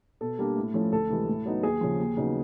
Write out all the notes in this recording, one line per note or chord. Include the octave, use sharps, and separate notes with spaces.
B2 A4
G3 A#3 D4
A2
F3 A3 C#4 E4
D2 A4
C3 E3 G#3
A2
F#3 B3 D#4
D#2 G#4
C#3 F3
D#2
C#3 F#3 B3 D#4